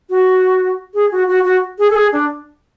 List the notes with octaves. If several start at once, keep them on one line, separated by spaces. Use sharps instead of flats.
F#4
G#4
F#4
F#4
F#4
G#4
A4
G#4
D4